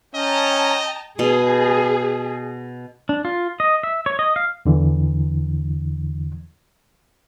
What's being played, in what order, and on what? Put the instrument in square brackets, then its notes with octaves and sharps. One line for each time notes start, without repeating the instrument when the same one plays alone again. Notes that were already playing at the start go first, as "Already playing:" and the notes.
[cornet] C#4 [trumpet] D#5 [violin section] G5 A5 A#5
[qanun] B2 [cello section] G#4
[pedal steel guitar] D4
F4
D#5
E5
C#5
D#5
F5
[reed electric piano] E2 D3 E3